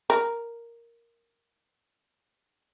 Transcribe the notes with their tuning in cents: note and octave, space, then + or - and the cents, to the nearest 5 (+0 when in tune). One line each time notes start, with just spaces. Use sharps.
A#4 +0